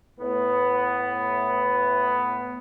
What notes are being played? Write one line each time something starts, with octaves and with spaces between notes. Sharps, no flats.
A2 B3